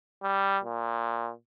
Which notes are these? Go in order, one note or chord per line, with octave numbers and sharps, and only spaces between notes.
G3
A#2